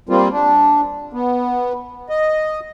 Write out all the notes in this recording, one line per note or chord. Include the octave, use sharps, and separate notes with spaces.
G3 A#3 C4 F4
D4
B3
D#5